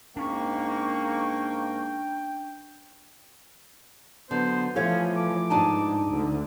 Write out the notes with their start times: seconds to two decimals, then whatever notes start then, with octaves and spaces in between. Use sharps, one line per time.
0.17 G#2 A#3 C#4 D4 G5 C#6
4.31 D3 F#3 B3 C5
4.76 E3 F3 A3 C#4 A4 C#5 F5
5.16 D6
5.50 G#2 D4 D#4 A5
6.12 D2 D3